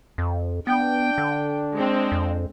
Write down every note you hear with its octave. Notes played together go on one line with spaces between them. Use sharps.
F2
B3 D4 G5
D3
G#3 C4
F2